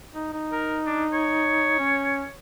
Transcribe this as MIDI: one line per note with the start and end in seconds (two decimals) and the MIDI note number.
0.14 0.33 63
0.33 1.75 63
0.52 0.77 70
0.86 1.03 62
1.13 2.38 73
1.79 2.24 61